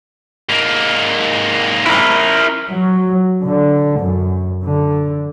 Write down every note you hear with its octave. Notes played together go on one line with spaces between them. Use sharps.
G#2 A#3
E4 A#4
F#3
D3
F#2
D3